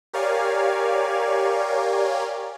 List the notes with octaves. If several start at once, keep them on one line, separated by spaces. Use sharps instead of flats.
G4 A#4 C#5 D5 F5 G#5